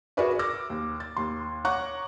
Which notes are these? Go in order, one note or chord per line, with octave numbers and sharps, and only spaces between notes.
F#4 G#4 A#4 B4 D5 E5
D6 E6 F6 A#6
D#2
A6
D#2 C6
C#5 F#5 A#5 C#6 D6 F#6